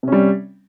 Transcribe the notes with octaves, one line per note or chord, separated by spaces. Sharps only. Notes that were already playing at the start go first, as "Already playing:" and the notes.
C3 G3 C#4